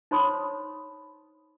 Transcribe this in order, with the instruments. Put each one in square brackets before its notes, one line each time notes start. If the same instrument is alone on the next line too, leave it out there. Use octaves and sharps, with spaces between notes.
[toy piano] D#4 C5 C#5 B5 C6 D#6